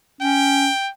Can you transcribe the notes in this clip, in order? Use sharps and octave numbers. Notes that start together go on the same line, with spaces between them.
C#4 G5